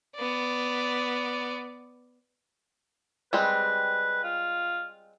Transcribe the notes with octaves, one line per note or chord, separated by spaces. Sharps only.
B3 D5
G3 G#3 C4 B4
F4